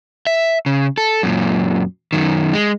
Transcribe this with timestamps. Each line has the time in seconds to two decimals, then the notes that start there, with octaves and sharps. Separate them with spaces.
0.27 E5
0.66 C#3
0.98 A4
1.23 F#2 A#2
2.13 F#2 D#3
2.53 G#3